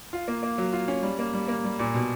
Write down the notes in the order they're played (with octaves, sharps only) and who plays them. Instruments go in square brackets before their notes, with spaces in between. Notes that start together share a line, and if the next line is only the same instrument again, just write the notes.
[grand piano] F4
A#3
A#3
F#3
F4
C#4
G3
A#3
G3
A#3
G3
A#2
B2